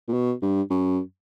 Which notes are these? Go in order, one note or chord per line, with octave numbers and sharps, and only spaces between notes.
A#2
B2
G2
F#2